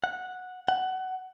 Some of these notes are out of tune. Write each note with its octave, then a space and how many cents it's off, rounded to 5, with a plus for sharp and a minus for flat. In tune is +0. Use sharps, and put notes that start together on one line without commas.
F#5 -10
F#5 +20